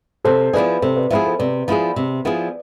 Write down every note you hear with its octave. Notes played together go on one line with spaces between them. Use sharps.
C3 A4 C5
F3 B3 E4 G#4 B4 D5
C3 A4 C5
B4 D5
F3 B3 E4 G#4 C5 E5
A4 C5
C3 B4 D5
F3 B3 E4 G#4
C3
F3 B3 E4 G#4